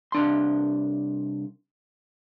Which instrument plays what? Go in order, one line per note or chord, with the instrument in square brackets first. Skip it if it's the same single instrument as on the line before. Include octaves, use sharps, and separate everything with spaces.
[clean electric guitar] C2 D4 C6